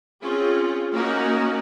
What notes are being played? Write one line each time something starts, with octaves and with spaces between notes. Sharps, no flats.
C4 C#4 F4 G#4
A#3 C#4 D#4 F#4 A#4